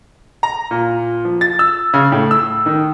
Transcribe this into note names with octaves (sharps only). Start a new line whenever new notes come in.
A#5
A#2
F3
A6
E6
C#3
A2
E6
D#3